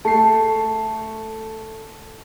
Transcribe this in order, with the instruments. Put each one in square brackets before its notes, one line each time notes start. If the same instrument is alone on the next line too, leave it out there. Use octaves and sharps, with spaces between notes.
[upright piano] A3 C7 [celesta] A5